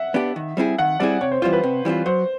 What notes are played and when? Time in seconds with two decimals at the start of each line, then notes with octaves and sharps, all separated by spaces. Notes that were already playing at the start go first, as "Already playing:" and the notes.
Already playing: E5 F#5
0.14 B3 D4 G4
0.36 D#3
0.57 G3 C4 E4 G#4
0.78 D#3 F#5
1.00 G3 C4 E4 G#4 D5
1.21 C3 C#5
1.32 C5
1.42 E3 G3 C4 F4 C5
1.53 B4
1.63 C3
1.85 E3 G3 C4 F4
2.06 F#3 C5